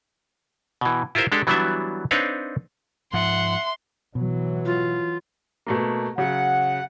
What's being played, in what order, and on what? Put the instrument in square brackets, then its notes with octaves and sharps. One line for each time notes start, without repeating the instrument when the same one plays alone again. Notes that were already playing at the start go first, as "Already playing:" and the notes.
[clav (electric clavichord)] B2 E3
E4 F4 G4 A#4 C5 E5
G#3 D4 G4 A4
E3 F#3 G3 B3 D4 E5
C4 D4 D#4 B4 C#5 F5
[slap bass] G#2 F3 [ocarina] E5 [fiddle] F#5 [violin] C6
[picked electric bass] B2 [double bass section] E3 F#3
[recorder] F4
[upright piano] B2 A3 A#3
[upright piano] C#3 F#3 [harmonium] F#5